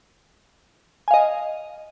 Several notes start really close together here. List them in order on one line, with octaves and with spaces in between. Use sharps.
G#5 F5 D#5